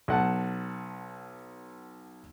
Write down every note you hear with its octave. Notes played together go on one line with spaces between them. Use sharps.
B1 F#5 A5